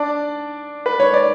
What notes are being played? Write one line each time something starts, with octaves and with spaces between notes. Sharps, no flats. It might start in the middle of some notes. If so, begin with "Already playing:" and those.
Already playing: D4 D5
B4
C#5
D5